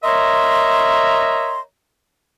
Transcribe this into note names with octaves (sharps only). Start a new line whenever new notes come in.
A#4 C#5 D#5 E5 A#5 C6